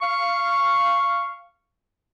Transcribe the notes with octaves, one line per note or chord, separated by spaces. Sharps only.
F5 C#6